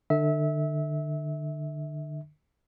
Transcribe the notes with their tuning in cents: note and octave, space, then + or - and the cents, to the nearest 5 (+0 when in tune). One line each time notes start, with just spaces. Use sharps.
D3 +35 E5 -25